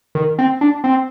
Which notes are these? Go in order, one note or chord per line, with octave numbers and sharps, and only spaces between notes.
D#3
C4
D4
C4